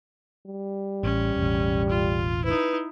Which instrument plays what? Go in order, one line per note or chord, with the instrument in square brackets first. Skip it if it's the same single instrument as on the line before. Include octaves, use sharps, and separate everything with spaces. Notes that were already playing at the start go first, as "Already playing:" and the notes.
[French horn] G3
[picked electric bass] A1 [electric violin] C#4
[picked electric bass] E1 A1
[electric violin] F4
[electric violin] D#4 E4 [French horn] B4